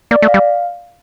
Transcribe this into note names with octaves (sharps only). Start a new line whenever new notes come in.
A#3 D5
A3
F5
G3